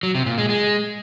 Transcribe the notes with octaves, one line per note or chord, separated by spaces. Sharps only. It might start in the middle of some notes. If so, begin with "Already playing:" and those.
F#3
C3
A#2
G#3
G#3